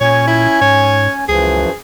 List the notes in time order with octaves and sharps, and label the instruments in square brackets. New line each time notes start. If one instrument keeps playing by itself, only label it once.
[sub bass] A#2 [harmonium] C#4 G#5 [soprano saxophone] C#5
[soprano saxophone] E4
[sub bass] G#2 [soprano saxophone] C#5
[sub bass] C#2 [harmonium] F#2 E3 F3 [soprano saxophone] G#4